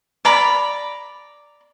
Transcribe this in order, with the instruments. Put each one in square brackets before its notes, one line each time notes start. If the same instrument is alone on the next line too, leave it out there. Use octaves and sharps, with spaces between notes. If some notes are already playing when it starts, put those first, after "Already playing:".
[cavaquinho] D5 A#5 B5